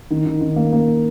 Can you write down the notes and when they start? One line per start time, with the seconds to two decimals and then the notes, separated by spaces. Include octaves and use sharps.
0.11 D#3
0.26 D#3
0.41 D#3
0.56 A#3
0.72 A#3